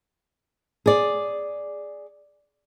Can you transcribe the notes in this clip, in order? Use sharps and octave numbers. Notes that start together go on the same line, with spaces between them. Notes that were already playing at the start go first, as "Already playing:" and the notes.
G#4 D5